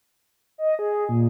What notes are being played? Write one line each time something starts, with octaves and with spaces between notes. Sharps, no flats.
D#5
G#4
A#2